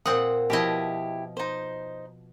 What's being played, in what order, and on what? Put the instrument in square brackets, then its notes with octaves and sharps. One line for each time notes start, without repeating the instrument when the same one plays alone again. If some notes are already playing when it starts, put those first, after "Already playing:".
[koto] A#2 C4 F#5 [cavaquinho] D#6
[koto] B2 F3 D#5 [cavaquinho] E4 G4
[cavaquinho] D#4 C5